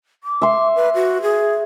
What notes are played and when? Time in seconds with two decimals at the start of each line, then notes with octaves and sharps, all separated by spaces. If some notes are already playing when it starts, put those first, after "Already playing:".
0.24 D6
0.42 E5 C6
0.76 B4
0.95 F#4
1.22 G#4